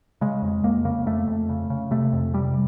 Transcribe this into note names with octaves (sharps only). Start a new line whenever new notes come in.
C#3 G#3
F2
F2 A#3
C#3 A#3
F2 A3
F2
C#3
C#3
C3 A3
F2
C3 G3